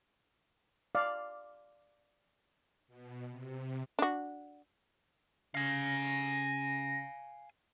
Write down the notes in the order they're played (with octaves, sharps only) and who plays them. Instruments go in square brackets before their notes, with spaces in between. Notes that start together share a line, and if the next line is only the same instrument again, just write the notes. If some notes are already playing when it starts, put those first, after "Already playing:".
[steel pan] D5 F5
[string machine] B2
C3
[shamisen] D4 F#4
[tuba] C#3 [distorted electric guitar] F5 G#5 [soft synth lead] A#6